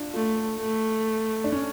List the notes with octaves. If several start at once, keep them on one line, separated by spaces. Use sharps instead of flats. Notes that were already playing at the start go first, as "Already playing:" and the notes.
Already playing: D4 F4
A3 F4
A3
D4
C#4